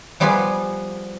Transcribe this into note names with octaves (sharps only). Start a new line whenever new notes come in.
F3 G3 B3 F4 G#4 B4